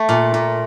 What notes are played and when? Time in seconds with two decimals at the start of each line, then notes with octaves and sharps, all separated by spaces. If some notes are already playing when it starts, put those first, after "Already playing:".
Already playing: A3
0.09 A#2
0.34 A#2